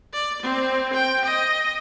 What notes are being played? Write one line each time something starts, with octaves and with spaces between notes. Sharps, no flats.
D5
C4
G5
D#5